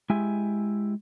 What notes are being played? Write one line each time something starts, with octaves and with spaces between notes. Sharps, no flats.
G#3 E4 G4 E5 G#5